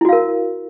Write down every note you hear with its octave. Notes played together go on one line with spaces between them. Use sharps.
E4 F#4 A#4 F5